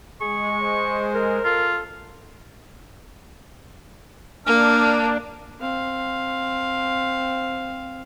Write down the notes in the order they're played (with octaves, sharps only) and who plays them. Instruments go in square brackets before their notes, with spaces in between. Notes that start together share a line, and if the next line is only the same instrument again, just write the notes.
[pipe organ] G#3 [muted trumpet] G#4 [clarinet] C#6
[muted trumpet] C5
[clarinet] A#4
[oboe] F4 [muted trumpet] A4
[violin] A#3 [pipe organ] D4 [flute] F6
[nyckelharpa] C4 F5